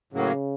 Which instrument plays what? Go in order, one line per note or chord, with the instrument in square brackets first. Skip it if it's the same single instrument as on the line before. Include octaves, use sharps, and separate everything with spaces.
[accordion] A2 F#3 A#3 [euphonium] C#3